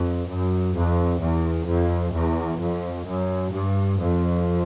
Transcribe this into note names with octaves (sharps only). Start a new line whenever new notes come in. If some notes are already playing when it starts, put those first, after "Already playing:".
Already playing: F2
F#2
F2
E2
F2
E2
F2
F#2
G2
F2